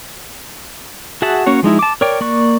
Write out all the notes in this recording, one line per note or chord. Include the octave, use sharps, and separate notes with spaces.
F#4 G#4 E5 F#5 A5
A#3 C#4 F#4 C#5
F3 G#3 D#4 E4
A5 D6
A#4 C#5 D5 G5
A#3 D5 C#6 F#6